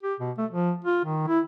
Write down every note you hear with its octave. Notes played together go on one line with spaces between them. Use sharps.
G4
B2
A3
F3
F4
D#3
E4